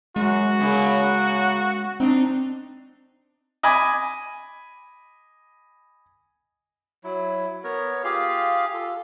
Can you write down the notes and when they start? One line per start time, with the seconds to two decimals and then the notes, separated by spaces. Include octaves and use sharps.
0.16 F#2 G#3 F#4
0.59 C#3 A#3 B3
2.00 C4 D4 D#4
3.63 D#5 G#5 B5 D6
7.04 F#3 E4
7.64 B3 A#4 C#5
8.04 F4 G4 G#4 F5
8.74 F4 A4